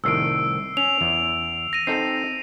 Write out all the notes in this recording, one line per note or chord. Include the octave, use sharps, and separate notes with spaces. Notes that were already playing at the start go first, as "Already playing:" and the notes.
C2 A2 D#3 E6 C7 D7
C#4 F7
E2
A#6 D#7
C4 D#4 A4 C7